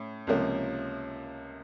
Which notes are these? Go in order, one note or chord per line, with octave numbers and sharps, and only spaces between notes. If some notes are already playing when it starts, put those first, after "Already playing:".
Already playing: A2 C#4
C#2 C3 F3 A#3 C#4